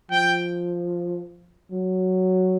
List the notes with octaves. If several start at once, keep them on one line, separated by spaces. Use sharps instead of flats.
F3 G5
F#3